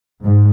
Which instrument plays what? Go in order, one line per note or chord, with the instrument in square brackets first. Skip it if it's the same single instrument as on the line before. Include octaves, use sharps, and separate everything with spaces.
[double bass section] G#2